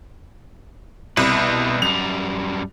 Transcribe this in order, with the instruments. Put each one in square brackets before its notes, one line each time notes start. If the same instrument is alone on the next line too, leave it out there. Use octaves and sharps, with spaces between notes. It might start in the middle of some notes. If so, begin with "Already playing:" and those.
[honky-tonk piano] C2 [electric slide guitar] B2 E4 B4
[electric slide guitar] F#2 G3 [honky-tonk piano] F7